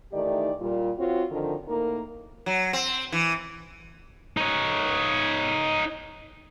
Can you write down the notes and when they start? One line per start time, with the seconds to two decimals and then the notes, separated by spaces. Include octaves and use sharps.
0.12 D#3 E3 A3 D#4 G4 D5
0.60 A#2 G3 F4
0.98 C4 F4 F#4 C#5
1.31 D3 D#3 F3
1.68 A2 A#3 D#4 A#4
2.46 F#3
2.73 C4
3.12 E3
4.37 D#4 C#5